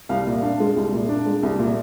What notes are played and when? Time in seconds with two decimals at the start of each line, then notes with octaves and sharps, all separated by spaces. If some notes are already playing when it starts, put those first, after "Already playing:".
0.09 C2 F5
0.27 A#2
0.43 D4
0.60 G#3
0.76 C2
0.93 A#2
1.09 D4
1.26 G#3
1.43 C2
1.59 A#2